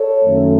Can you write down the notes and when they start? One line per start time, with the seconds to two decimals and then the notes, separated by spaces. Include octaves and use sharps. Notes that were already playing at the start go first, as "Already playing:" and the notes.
Already playing: A4 C#5
0.23 F#2 D#3 A3